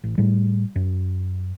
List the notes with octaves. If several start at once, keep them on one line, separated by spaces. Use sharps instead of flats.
A1
A2 G3
F#2